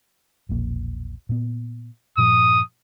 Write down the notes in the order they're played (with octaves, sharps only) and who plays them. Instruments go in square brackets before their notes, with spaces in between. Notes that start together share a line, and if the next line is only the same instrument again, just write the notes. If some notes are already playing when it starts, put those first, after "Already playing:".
[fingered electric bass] E1 A#1 A#3
A#2 B3
[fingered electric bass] G2 A#2 F3 [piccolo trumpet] D#6